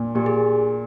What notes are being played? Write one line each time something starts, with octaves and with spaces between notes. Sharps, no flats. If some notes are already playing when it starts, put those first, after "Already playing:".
Already playing: A#2
A#2 G4
G#4